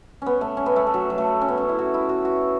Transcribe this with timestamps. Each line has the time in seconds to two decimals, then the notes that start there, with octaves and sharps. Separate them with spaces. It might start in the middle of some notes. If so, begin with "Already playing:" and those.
0.22 B3 C#4
0.41 A3
0.57 C#4
0.66 B3
0.76 A3
0.87 A3
0.94 F#3
1.10 F#3
1.18 A3
1.41 C#4
1.48 B3
1.58 C#4
1.69 E4
1.79 F#4
1.94 E4
2.09 F#4
2.25 F#4